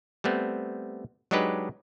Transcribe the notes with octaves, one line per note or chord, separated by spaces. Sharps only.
G3 A3 B3 C4
F#3 G#3 D4 D#4 G4 B4